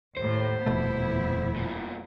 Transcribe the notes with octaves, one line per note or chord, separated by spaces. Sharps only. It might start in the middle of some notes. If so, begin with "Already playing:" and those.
D#2 A2 C5
D#1 F2 B2 A3 B3 E4
C2 A#2